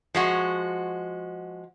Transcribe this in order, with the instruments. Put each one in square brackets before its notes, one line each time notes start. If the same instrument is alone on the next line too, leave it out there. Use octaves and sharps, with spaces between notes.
[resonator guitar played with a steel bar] F3 G#3 F#4